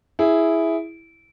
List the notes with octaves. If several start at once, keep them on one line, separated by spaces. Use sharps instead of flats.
E4 G#4